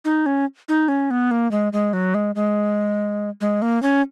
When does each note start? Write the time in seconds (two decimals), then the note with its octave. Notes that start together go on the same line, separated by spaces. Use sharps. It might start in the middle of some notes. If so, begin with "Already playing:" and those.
0.05 D#4
0.26 C#4
0.69 D#4
0.88 C#4
1.11 B3
1.31 A#3
1.51 G#3
1.73 G#3
1.93 F#3
2.14 G#3
2.35 G#3
3.41 G#3
3.62 A#3
3.83 C#4